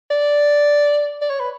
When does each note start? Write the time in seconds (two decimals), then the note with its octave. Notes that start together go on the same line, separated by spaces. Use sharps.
0.11 D5
1.21 D5
1.30 C#5
1.40 B4